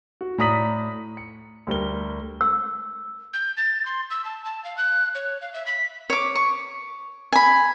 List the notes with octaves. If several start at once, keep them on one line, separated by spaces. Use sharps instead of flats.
F#4
A2 D5 A#5 D#6 B6 F#7
C#7
D2 G3 A#4 G7
E6
G6
A6
C6
E6
A5
A5
F5
F#6
C#5
F5
E5
B6
C#5 D6
C#6
G#5 B5